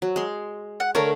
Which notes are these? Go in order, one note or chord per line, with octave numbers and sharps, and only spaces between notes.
F#3
G#3 C6
F#5
D3 A3 A#4 C#5